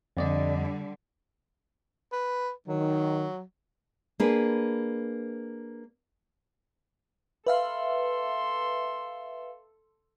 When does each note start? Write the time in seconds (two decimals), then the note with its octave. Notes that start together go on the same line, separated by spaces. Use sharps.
0.17 F2 D3 G3 D5 D#5
2.12 B4
2.68 D#3 F#3
4.20 A#3 D4 G#4 B4
7.47 A4 B4 E5 F5 C6